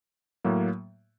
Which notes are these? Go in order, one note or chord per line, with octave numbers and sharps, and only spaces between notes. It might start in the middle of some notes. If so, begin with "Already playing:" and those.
A2 F#3 A#3